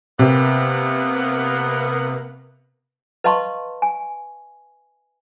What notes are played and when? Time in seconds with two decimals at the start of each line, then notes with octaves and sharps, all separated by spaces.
0.19 C3 A#3 B3
3.24 B4 D#5 F5 A5 C6 C#6
3.82 G#5